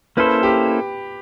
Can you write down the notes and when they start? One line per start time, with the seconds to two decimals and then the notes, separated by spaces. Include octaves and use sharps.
0.17 A#3 C#4 E4 A4 B4 C5
0.43 G4